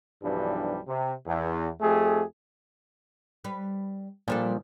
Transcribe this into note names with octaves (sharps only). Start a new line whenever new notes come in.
B1 G2 E3 F3 G3 D4
C3
E2
F2 A3 G4 G#4
G3 B4
A#2 F3 G3 D4 A4